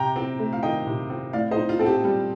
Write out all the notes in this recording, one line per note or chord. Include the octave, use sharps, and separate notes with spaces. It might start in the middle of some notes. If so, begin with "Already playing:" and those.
Already playing: C3 G5 A#5
C4
A3
F5
D#3 D#5 G5
C3
C4
A2 D5 F5
C5 D#5
D#4
F4
C4 A4
G4
G3